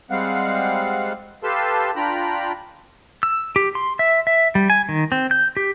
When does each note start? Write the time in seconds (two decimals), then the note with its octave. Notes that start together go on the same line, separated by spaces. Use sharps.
0.10 G3 G#3 C4 F5 F#5
1.43 G4 A4 B4 F5 A5 C6
1.96 D4 F4 G5 A#5 B5
3.23 E6
3.56 G4
3.75 C6
3.99 E5
4.27 E5
4.55 G3
4.70 G#5
4.89 D#3
5.12 C4
5.31 G6
5.57 G4